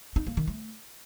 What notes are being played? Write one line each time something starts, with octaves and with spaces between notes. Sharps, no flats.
D#4
A#3
D#3
A3